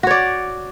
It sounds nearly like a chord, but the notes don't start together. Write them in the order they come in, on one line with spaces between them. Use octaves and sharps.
F#4 C#5 D5